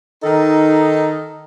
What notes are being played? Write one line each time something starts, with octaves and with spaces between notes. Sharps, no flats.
D#3 D#4 A4